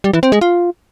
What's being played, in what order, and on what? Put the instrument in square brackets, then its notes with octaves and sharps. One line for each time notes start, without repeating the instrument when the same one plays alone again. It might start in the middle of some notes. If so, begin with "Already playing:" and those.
[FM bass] G3
E3
C4
G#3
F4